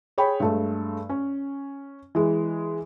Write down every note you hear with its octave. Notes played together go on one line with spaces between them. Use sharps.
G#4 C#5 G5 B5
G2 G#3 A3
C#4
E3 G#3